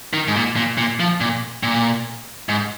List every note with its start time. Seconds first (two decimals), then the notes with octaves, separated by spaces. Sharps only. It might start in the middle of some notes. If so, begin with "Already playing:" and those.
0.13 D#3
0.28 G#2
0.36 A#2
0.56 A#2
0.78 A#2
1.00 F3
1.21 A#2
1.63 A#2
2.49 G#2